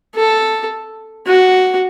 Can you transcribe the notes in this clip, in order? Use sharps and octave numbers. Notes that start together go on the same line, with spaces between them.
A4
F#4